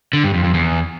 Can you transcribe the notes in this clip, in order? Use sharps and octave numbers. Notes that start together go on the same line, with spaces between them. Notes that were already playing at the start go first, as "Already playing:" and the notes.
D3
G2
F2
F2
E2